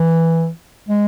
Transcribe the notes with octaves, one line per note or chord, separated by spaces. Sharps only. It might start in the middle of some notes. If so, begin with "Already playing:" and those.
Already playing: E3
G#3